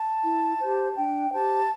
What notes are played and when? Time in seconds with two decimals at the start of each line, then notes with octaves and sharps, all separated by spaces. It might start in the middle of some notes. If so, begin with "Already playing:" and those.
Already playing: A5
0.24 E4
0.59 G4 C5
0.96 D4 G5
1.32 G4 C5 A5